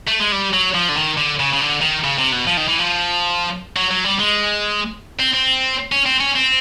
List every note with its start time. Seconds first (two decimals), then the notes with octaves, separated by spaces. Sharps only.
0.07 A3
0.20 G#3
0.32 G3
0.53 F#3
0.74 F3
0.89 D3
0.96 D#3
1.17 D3
1.40 C#3
1.53 C#3
1.61 D3
1.82 D#3
2.04 C#3
2.18 C3
2.32 B2
2.47 F3
2.57 D#3
2.69 E3
2.79 F3
3.76 F#3
3.91 F#3
4.04 G3
4.19 G#3
5.20 C4
5.34 C4
5.92 C#4
6.06 C4
6.20 C#4
6.35 C4